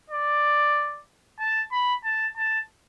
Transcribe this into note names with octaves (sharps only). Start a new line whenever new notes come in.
D5
A5
B5
A5
A5